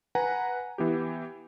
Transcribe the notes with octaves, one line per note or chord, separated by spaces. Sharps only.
B4 F#5 G#5 A#5
E3 B3 G4